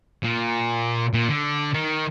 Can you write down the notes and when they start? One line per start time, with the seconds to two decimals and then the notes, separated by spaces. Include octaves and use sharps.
0.24 A#2
1.14 A#2
1.29 D3
1.74 D#3